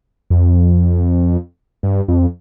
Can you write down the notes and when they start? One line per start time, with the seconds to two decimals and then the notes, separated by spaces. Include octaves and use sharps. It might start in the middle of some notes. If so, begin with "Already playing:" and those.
0.30 F2
1.83 G2
2.08 F2